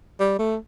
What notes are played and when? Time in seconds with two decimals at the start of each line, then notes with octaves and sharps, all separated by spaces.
0.20 G3
0.39 A3